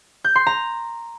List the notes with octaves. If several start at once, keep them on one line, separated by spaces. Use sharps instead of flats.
G6
C6
A#5